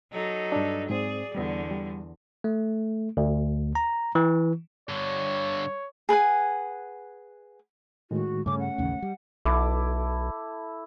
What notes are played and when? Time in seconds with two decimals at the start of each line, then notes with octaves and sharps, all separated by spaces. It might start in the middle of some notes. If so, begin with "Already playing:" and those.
0.12 F#3 D#4 A4
0.52 G2 D4
0.90 G#2 C4 G#4 D5
1.35 E2 D3 G3 B3
1.71 G3
2.44 A3
3.17 D2
3.75 A#5
4.15 E3
4.89 G2 D3 C#5
6.09 G#4 B4 F#5 G#5
8.11 A2 D#3 G#3 F#4
8.46 G2 C#3 A3 C#4 D6
8.59 F#5
8.78 A1 D#2 C#3
9.02 G3
9.45 B1 E4 A4 D6